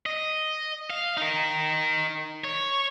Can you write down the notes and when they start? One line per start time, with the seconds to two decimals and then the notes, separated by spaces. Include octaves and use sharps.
0.06 D#5
0.90 F5
1.17 D#4 A#4
2.44 C#5